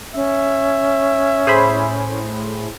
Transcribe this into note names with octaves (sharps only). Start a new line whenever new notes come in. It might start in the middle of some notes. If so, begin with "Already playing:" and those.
C#4 E5
A2 G#4 C5 B5